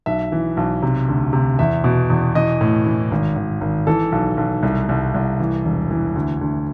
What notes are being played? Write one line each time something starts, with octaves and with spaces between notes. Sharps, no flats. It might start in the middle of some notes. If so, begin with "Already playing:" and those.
B1 E5
E3
B1
C3
D2
C3
E2 E5
B2
E2
E3 D#5
A2
E3
G#1
G#1
G#1
E3 A4
B1
B1
C2
C2
C2
E3
E1
E3
D2
D2